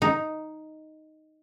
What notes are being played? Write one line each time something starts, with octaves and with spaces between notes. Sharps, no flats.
D#4